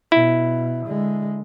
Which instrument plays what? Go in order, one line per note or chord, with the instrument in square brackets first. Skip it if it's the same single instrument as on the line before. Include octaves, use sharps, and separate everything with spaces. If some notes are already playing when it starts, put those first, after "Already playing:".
[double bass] B2 [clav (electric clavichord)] E4
[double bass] D3 G#3